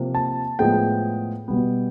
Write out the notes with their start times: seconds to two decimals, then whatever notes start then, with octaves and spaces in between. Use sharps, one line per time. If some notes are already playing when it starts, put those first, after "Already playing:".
Already playing: C3 F3 A#3
0.15 A5
0.59 A2 F3 G#3 B3 G5
1.48 B2 G3 B3